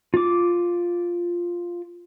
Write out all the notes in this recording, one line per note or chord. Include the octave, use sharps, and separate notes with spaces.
F4 D6